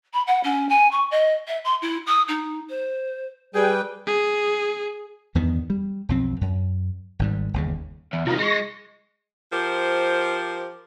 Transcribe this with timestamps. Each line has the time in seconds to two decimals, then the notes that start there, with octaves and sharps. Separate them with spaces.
0.13 B5
0.27 F#5
0.43 C#4
0.69 G#5
0.91 C#6
1.11 D#5
1.47 E5
1.64 C6
1.81 E4
2.06 D#6
2.28 D#4
2.69 C5
3.55 G3 G#4 B4 G5
4.06 G#4
5.35 E2 G2 D#3 B3
5.70 G3
6.09 B1 F2 C4
6.41 F#2
7.19 G#1 G#2 G3
7.54 G1 D#2 C#3
8.13 E2
8.27 C2 D#3 F4 A#5
8.39 G#3 C#6 A#6
9.52 F3 G4 A#4 C5